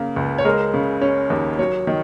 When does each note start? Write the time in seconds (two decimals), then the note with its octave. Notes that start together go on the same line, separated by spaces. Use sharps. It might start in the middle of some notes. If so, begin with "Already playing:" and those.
Already playing: C#3 A#3
0.16 C#2
0.38 C#5
0.45 G#3 A#4
0.74 C#3
1.02 C#4
1.30 D#2
1.59 F#3 C#5
1.87 D#3